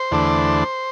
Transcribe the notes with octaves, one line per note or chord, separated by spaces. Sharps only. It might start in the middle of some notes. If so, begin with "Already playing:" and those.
Already playing: C5
E2 D3 A3 D4